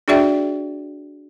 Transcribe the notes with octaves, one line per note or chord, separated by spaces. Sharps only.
D4 F#4 G#4 D5 E5 G5